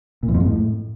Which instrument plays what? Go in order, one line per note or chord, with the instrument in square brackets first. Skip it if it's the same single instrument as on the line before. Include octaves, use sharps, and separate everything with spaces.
[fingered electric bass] A#2
E2
F2
G#2
A2